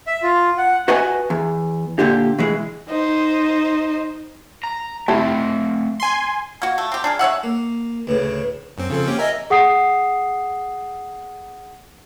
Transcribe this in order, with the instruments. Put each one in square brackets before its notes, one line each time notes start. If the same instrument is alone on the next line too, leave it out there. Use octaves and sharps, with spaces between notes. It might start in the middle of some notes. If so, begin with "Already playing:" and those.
[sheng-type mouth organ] E5
F4
F#5
[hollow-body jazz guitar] F#4 B4 D#5 F#5 G#5 A5
E2
A#2 D3 G4
B2 E3 G#3
[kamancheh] D#4 C5
[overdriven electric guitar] A#5
[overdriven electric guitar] A3 C4 [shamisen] E4 G4 A5
[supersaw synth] G#5 C6
[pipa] A#3 F#4
A3
C4 G4
D4 G#4 A#4
G#3 C#5 E5 F#5
[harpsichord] A#3
[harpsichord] D2 A2 C#3 [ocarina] B4
[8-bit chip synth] F#2 C4
[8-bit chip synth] C#3 F3 C4 [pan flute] A4
[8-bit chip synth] A#3 C#4 G4 [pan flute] G5
[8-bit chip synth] A#4 E5 G#5 [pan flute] D#5
[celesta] G#4 F#5 D#6 C7